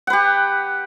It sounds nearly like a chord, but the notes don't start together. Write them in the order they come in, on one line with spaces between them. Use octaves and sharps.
F#5 B4 G4